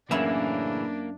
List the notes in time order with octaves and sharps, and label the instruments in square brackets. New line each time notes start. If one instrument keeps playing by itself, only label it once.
[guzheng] F#2 E4 [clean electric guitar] A2 C#3 E3 [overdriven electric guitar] A#3 [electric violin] D4